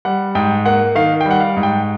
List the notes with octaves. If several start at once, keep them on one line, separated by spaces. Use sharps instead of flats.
G3 F#5
G#2 G5
A#3 F#5
D#3 F5
G5
G3
F#5
F5
G#2
G5